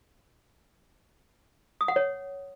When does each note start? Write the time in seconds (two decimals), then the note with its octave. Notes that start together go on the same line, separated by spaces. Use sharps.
1.81 D#6
1.88 F#5
1.96 C#5